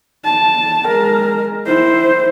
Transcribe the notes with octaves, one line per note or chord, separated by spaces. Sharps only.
A5
G#3 A#4
E4 C5